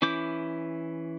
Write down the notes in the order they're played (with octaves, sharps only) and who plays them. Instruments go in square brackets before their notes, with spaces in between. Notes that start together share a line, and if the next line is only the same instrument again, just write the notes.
[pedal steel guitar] E3 C#4 E4 D6 G6